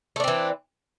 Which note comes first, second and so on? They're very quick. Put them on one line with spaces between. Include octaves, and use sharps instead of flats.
A3 D4 C4 E3